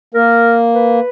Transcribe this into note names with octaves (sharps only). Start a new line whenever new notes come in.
A#3 A#4
B4